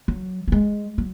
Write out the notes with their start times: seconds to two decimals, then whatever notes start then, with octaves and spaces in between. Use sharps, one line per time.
0.08 F#3
0.48 F#3
0.52 G#3
0.98 F#3